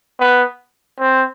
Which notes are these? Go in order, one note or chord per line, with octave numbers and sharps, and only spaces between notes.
B3
C4